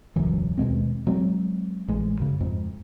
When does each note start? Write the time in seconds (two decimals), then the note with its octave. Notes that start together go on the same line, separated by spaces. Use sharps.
0.16 E1 C#2 F#2 E3
0.58 D#2 B2 G#3 C4
1.07 F#3 G#3 C4
1.88 A1 G#3
2.20 F#2 C#3
2.40 F2 G#2